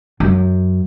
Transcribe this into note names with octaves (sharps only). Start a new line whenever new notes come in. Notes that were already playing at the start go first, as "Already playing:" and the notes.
F#2